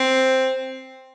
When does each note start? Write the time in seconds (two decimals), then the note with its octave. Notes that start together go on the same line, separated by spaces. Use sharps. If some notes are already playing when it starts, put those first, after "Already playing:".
Already playing: C4